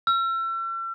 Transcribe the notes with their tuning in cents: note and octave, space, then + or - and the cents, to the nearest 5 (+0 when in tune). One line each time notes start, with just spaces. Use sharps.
E6 +40